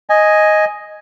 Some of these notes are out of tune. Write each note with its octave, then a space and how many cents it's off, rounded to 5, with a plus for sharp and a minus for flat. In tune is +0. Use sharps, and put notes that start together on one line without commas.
D#5 +0 G#5 +0